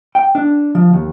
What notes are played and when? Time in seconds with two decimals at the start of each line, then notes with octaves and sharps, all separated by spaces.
0.15 G5
0.35 D4
0.75 F3
0.93 D#2